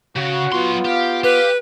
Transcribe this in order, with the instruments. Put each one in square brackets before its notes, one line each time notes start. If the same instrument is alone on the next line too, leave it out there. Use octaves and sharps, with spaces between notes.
[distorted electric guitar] C#3 [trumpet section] F#4
[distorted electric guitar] F#3 C6 [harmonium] B3 F4
[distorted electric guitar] G4 [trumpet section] F5
[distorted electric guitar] G4 [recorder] B4